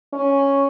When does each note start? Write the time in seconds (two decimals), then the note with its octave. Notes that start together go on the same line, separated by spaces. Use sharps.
0.13 C#4